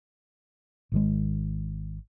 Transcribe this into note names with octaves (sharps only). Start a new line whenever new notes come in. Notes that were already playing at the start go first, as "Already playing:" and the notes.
G#1 D#3 G#3